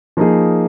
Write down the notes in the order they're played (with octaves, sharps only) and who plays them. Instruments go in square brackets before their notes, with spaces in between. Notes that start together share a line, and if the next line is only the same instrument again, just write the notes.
[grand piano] F3 A#3 D#4 G#4